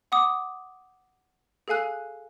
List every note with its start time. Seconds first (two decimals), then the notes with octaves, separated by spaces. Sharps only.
0.12 F#5 D6 D#6
1.68 G#4 A4 F5 G#5 F#6